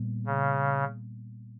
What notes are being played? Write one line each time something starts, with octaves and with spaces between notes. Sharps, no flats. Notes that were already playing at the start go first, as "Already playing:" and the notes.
Already playing: A#2 G3 B3
C#3